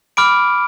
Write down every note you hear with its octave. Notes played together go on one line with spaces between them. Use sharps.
B5 D6 F6 D7